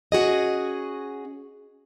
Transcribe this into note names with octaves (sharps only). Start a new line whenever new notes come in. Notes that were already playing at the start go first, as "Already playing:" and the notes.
C#4 F#4 G#4 D#5